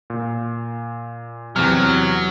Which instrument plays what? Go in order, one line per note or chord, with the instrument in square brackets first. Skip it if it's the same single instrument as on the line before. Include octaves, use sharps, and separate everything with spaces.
[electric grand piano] A#2
[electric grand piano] E2 C3 F6 [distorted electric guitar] F#3